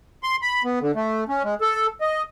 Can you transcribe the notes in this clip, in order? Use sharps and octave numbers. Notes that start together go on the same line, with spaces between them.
C6
B5
B3
D3
A3
C#4
G#3
A4
D#5